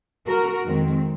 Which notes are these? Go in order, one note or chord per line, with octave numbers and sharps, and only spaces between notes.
F#4 A#4
F2 D#3 G#3 C4